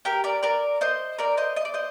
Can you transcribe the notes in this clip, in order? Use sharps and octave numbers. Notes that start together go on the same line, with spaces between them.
G4 A#4
A#4 D5
A#4 D5
C5 D#5
A#4 D5
C5 D#5
D#5
D5
C5 D#5